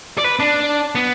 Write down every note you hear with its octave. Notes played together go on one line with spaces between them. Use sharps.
D5
B4
D4
B3